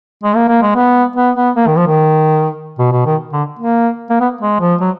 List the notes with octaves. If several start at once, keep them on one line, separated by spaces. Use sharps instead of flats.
G#3
A#3
A#3
G#3
B3
B3
B3
A#3
D#3
F3
D#3
B2
B2
D#3
D3
A#3
A#3
B3
G#3
F3
F#3